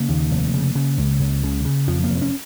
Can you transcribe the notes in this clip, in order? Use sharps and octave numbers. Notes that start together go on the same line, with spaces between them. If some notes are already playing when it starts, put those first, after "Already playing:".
Already playing: C#3 A#3
D#2
F1
C#3
C#3
C#2
C#2
C#3
C#3
F2 F3
A#3
F1
C#4